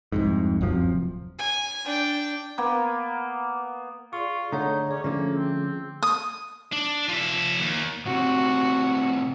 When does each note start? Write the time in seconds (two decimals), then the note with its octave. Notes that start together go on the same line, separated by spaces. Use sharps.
0.12 C2 F2 G#2
0.61 D1 F#2 C3 F3
1.39 G#5
1.85 D4 G5
2.58 A#3 B3
4.13 F4 G#4 D5 C#6
4.53 D3 A3 D#4 C#5 F#5 A#5
4.91 C#4 G#4 D5 D6
5.04 D3 F3 A3 A#3 C#4
5.37 C4
6.03 D#6
6.72 D4
7.09 F3 E5
7.60 D#2
8.06 A2 C3 C4 F#4